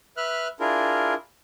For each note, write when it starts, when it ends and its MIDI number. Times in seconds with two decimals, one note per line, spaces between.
0.17 0.48 71
0.17 0.48 76
0.17 0.48 89
0.17 0.48 90
0.60 1.14 62
0.60 1.14 64
0.60 1.14 65
0.60 1.14 68
0.60 1.14 70